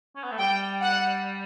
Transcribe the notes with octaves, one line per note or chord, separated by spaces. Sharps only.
C#4
B3
A3
G3 G5
F#5